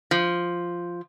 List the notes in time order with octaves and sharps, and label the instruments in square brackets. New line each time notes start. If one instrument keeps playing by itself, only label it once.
[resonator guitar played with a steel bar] F3